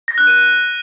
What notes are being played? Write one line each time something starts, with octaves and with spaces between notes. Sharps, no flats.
A#6
F#6
D#7